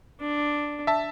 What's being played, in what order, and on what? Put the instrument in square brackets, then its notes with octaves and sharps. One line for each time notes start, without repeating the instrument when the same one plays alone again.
[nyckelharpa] D4
[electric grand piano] E5 A5